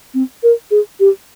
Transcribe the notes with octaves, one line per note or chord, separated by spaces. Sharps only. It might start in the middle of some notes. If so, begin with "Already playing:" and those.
C4
A#4
G#4
G4